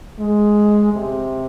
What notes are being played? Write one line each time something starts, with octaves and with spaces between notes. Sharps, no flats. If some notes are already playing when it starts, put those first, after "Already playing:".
G#3
C3